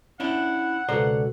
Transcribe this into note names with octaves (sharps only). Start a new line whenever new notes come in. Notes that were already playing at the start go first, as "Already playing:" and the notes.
C#4 D4 E4 F#5
C#2 B2 F#4 A4 B4 C5 D5 A#5